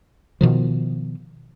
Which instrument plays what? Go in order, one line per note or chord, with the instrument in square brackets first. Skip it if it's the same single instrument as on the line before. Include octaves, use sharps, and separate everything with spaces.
[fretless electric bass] B2 D#3 F3